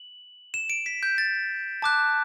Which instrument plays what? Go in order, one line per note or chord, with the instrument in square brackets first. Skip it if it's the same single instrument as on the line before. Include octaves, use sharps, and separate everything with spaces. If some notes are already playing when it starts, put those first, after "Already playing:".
Already playing: [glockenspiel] F#7
E7
D7
B6
G6
A6
A5 D6 F#6